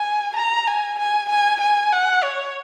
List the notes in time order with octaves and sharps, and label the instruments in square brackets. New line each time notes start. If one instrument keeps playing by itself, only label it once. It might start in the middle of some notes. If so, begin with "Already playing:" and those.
Already playing: [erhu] G#5
A#5
G#5
G#5
G#5
G#5
F#5
C#5